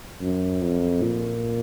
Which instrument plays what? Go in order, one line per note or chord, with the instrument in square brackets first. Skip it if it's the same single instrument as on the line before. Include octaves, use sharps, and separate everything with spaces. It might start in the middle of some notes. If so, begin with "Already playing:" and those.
[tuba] F#2
F2
A#2